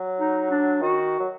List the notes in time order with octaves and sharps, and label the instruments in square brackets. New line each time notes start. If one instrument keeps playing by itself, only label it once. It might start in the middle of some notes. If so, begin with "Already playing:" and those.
Already playing: [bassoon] F#3
[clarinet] D#4
D4
[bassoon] D#3 [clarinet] F#4
[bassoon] F#3